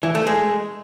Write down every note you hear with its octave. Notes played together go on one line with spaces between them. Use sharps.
E3
A3
G#3